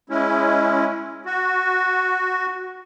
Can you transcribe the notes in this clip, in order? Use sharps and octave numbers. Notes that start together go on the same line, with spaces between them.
G#3 C#4 E4
F#4